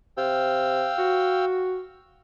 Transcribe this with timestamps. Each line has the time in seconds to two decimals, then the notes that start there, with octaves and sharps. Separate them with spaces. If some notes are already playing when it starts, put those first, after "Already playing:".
0.17 C3 F5 G5 E6
0.98 F#4